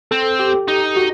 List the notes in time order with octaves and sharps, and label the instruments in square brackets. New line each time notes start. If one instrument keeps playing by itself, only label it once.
[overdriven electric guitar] C4 [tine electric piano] A4
[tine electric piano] G4
[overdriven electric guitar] D#4
[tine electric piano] F#4